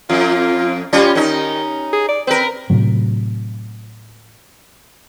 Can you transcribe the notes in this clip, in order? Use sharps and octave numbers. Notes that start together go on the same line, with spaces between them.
F2 F4
G3 C#4 F4
D#3 C#4 D#4
G#4
D5
C4 A#4 B4
A2 C3 F#3